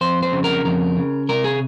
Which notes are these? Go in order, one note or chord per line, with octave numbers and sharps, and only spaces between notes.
F2 C5
C5
C#3
A#4
F2 A#4
C#3
C3 A#4
G#4